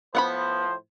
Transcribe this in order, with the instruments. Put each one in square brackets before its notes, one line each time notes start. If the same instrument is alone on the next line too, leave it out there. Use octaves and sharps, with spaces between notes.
[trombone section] A2 F3 C5 [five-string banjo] B3 F#5 B5